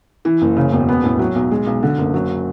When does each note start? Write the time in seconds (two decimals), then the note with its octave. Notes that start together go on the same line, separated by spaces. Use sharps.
0.25 E3
0.41 F#1
0.56 C#3
0.73 E1
0.89 B3
1.04 A2
1.19 F#3
1.35 B1
1.51 G#3
1.67 B1
1.83 D3
1.98 F#1
2.14 F#3